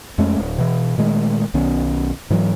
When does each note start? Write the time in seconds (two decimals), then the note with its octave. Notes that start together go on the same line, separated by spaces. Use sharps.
0.18 F2 G#3 A3 C#4
0.40 D1
0.58 B2 E3
0.98 A#2 D#3 G#3 A3
1.54 B1 D#3 B3 C#4
2.30 G#2 E3 F#3